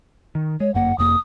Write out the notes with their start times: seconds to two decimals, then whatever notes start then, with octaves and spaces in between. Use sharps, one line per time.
0.35 D#3
0.60 G#3 C#5
0.74 G1 F#2 A#3 F#5
0.98 F1 F2 A#3 D#6